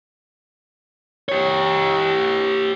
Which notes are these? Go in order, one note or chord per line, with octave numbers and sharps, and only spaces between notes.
G4 C#5